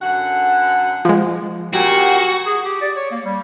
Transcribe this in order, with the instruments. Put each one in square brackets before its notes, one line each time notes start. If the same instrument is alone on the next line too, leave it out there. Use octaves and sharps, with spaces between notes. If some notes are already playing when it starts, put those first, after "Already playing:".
[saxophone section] F#2 D3 F#5
[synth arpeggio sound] F3 G#3
[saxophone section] F#2 A#2 G4 [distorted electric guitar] F#4
[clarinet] G#4
G4
D5
C#5
A#3
G3